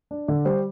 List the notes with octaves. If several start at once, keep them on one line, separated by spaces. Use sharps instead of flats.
D4
D3
G3 C5